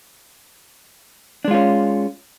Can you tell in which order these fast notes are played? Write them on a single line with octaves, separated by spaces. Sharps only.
D4 G#3 F4 C#4